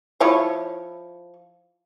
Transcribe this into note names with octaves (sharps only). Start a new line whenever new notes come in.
F3 E4 C#5